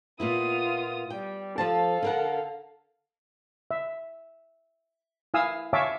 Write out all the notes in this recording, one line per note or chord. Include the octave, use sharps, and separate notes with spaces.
A#2 B3 E4 F4 D#6
G3 G5
F3 A4 C5 F5 A5
D3 A#4 F#5
E5
E4 F5 G#5 D#6 E6
C#5 E5 F5 G#5 A5 D6